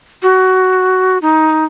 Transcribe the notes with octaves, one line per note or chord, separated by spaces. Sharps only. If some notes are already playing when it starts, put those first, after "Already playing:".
F#4
D#4